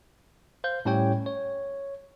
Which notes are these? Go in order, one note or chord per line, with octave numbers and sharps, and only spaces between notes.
C5 F5 G6
A2 G3 C#4 G4 C#5 G5
C#5